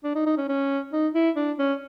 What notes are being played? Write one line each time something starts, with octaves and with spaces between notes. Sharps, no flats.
D4
D#4
D#4
C#4
C#4
D#4
E4
D4
C#4